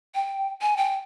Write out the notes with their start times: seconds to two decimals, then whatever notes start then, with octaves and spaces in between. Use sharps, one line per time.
0.15 G5
0.62 G#5
0.77 G5